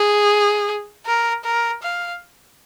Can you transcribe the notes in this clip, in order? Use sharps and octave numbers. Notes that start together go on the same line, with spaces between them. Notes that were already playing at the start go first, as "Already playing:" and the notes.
Already playing: G#4
A#4
A#4
F5